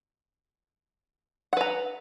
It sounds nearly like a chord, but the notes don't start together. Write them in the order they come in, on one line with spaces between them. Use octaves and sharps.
F#5 B4 A#5